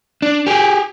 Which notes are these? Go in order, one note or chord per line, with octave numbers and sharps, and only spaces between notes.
D4
G4 G#4